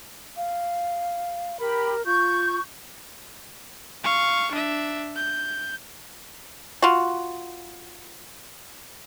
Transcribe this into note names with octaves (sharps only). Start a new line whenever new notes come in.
F5
G4 A#4 B5
F4 C#6 G6
F5 C#6
D4 E5
G6
F4 F#4